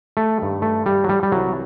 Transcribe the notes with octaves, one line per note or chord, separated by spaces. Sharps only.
A3
G2 D#3
A3
G3
F#3
G3
G3
C2 C3 E3 F#3